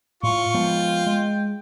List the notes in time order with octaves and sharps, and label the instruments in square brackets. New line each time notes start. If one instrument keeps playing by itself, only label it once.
[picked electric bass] A2 [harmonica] F4 [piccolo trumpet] C#6
[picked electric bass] F3 G#3 B3 [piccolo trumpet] G5
[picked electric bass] G#3